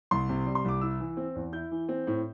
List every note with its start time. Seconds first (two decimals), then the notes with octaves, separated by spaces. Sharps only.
0.11 C2 C6
0.29 C3
0.46 G3
0.55 C6
0.65 C2 D6
0.81 E4 E6
1.00 E3
1.17 C4
1.36 E2
1.53 E4 G6
1.71 E3
1.89 C4
2.07 A2